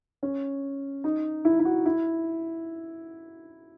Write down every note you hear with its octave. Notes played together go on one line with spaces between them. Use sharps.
C#4
D#4
E4
E4
F#4
E4